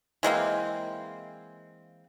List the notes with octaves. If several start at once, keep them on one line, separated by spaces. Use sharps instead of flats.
E3 G#3 A#3 C4